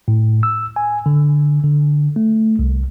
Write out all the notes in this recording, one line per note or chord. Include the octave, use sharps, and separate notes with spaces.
A2
E6
G#5
D3
D3
A3
C2